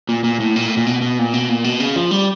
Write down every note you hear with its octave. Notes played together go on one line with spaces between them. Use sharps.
A#2
A#2
A2
A#2
A2
A#2
B2
B2
A#2
B2
A#2
B2
C#3
F3
G3